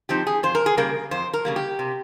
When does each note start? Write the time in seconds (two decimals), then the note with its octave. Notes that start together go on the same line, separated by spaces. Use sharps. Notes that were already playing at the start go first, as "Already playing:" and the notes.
0.09 F3 C4 D#4 G4
0.27 G#4
0.43 F2 C5
0.55 A#4
0.66 G#4
0.77 C#3 G3 A#3 A#4
1.11 F2 C5
1.33 A#4
1.45 C#3 G3 A#3
1.56 G4
1.79 C3